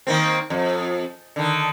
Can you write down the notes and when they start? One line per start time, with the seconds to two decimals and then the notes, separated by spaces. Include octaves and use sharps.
0.07 D#3 A#3 C4
0.50 F2
1.36 D3 D#3